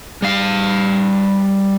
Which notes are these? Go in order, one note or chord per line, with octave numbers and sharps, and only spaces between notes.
G3 F5